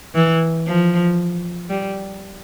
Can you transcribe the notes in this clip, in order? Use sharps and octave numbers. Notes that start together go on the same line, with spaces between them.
E3
F3
G3